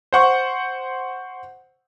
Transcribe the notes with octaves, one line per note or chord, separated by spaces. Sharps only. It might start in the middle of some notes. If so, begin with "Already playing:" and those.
C5 F#5 C#6